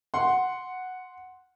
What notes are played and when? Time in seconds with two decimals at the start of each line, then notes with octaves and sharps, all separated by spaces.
0.14 F#5 C6